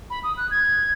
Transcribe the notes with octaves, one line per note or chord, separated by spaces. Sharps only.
B5
D#6
F#6
G#6